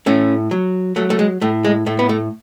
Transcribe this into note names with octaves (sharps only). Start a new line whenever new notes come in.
A2 A3 C#4
F#3
F#3 A3
A3
G#3
A2 A3
G#3
A2 A3
B3
A3